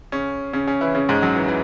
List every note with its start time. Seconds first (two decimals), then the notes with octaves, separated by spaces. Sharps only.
0.12 C#3 C#4
0.53 C#3 C#4
0.67 C#3 C#4
0.81 E3 E4
0.95 C#3 C#4
1.09 G#2 G#3
1.22 F#2 F#3
1.36 E3
1.48 E3